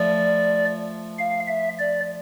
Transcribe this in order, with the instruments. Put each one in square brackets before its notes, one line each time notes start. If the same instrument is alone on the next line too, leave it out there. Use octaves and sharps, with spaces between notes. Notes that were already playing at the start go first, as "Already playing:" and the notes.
Already playing: [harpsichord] F3 A3 [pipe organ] D5
[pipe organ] F5
E5
D5